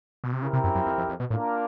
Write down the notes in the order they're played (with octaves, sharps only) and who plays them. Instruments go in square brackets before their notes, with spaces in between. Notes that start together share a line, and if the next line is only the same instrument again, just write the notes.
[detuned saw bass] B2
C3
[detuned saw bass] C#3 [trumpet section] C4 E4 G4 A#4
[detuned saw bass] C3
F#2
F#2
F2
F2
F2
B2
[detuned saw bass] A2 [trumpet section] A#3 D4 F4 A#4